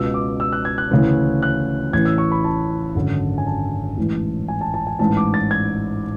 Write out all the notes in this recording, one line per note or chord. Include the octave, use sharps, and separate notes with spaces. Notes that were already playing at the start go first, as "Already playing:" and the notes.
Already playing: C#2 B2 E6
D6
E6
F#6
G#6
F#6
D2 C#3 E3
F#6
A1 A2 E3 G#6
E6
C#6
B5
A5
G#1 F#2 D3
G#5
A5
A1 G#2 E3
G#5
A5
A5
G#5
A1 G#2 E3 A5
D6
A6
G#6